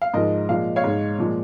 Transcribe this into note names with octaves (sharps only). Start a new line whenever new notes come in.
F5
G#2 F3 G#3 A#4 D#5
A#2 F3 G#3 F5
C#5 F5
G#2 G#3
A#2 F3 G#3